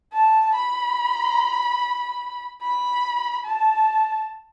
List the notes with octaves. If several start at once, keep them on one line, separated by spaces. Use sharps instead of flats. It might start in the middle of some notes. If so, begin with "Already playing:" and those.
A5
B5
B5
A5